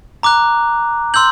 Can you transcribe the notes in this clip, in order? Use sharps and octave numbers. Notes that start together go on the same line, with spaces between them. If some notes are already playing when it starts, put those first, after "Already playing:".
A#5 D6 F#6
C6 E6 G6 F#7